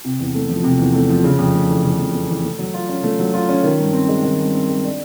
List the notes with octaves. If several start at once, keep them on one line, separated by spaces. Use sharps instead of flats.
C3
E2
A3
F3
C3
E2
A3
F3
C#3
F2
A3
E3
C#3
F2
A3
E3
A3
F#3
F4
C#4
A3
F#3
F4
C#4
D#3
G2
C4
G#3
D#3
G2
C4
G#3
D4